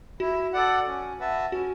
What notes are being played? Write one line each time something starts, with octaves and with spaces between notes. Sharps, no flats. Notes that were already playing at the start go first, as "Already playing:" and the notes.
E4 F#4
A4 D5 F#5
C#4
F#4 B4 E5 A5
C#4 F#4